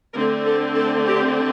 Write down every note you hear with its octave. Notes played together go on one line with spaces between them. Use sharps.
D3 A3 C4 A#4
A4
A4
G4